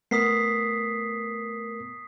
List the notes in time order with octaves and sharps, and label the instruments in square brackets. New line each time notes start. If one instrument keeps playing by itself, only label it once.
[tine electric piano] A3 B3 A#4 [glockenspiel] D#6 B6 C7